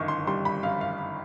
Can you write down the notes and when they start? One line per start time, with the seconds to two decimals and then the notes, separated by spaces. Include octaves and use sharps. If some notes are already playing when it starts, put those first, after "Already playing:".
Already playing: G1 F#2 D#3 C#6
0.08 C6
0.27 G3 C6
0.45 B5
0.63 F#2 F5
0.81 F5